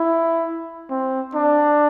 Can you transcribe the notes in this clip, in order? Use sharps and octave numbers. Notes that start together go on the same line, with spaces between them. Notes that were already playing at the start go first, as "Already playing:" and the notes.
Already playing: E4
C4
D4